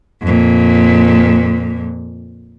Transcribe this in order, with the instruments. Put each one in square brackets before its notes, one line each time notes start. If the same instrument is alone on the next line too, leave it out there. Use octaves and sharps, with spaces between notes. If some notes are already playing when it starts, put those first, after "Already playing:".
[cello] F2 A#2